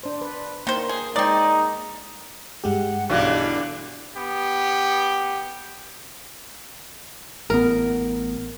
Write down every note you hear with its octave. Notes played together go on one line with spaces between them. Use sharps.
D4 C5
B4
D#3 A#3 C5
G#4
G#3 C4 D#4 D5 D#5
G2 G#3 G4 F#5
B1 A2 D3 E3 D4
B3 G4
A1 B3 A#4